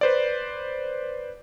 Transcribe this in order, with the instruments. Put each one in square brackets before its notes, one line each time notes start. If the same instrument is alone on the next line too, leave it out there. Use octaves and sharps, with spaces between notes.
[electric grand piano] B4 C5 D5